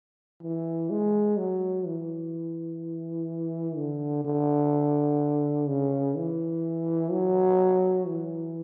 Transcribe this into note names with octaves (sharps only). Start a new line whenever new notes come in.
E3
G#3
F#3
E3
D3
D3
C#3
E3
F#3
E3